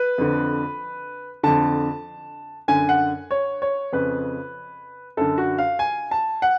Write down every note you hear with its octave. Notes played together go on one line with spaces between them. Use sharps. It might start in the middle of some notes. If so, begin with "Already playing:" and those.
Already playing: B4
F2 D3
F2 D3 A5
F#2 D3 G#5
F#5
C#5
C#5
F2 C#3 B4
F#2 D3 A4
F#4
F5
G#5
A5
F#5